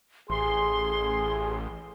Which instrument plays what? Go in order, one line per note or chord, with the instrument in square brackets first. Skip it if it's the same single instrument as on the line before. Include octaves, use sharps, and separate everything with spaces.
[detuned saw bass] A1 [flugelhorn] G#4 [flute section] C6